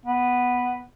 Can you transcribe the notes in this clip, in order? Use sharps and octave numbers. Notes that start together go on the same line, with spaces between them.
B3